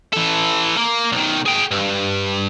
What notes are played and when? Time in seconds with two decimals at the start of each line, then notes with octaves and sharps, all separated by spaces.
0.13 E3 A4
0.77 A#3
1.12 B1 D#3
1.46 G#4 G5
1.71 G2